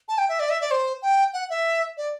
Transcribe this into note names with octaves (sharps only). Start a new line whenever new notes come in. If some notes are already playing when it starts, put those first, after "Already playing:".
A5
G5
E5
D5
E5
D5
C5
G5
F#5
E5
D5